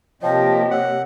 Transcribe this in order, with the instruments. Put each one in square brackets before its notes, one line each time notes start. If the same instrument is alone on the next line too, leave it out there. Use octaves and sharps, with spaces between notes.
[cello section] C3 A#3 G4 [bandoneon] F3 [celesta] C#5 G5 A5 [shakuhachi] D#5
[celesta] C#5 E6 F#6 [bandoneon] F#5